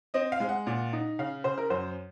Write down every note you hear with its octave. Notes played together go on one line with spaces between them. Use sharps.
C4 D#5
F5
G#3
F#5
A#2
D#4
C#3 F5
C#3 C5
A#4
F#2 C5